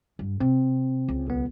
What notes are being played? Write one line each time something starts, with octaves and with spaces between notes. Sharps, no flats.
G2
C3 C4
C#2
B1 B3